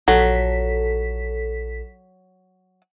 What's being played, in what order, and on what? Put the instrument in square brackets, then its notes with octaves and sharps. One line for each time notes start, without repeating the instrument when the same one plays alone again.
[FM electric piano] A#1 A4 B6 [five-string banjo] F#3